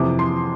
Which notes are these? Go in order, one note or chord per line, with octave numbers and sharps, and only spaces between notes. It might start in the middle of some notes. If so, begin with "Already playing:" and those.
Already playing: F2 C3 E3 D6
C6